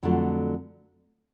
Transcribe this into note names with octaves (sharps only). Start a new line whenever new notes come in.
F2 D3 F#3 A3 F4